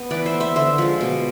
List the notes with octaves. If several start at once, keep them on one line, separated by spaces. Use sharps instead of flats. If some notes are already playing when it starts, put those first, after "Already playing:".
Already playing: B3
E3 B4 D5
C5 E5
B3
C5 E5
D3 C5 E5
F3 G#3
B2